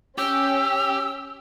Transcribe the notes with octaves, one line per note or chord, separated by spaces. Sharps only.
C#4 G4 E6